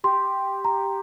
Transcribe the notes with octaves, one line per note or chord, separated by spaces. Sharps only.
G4 C6
A#5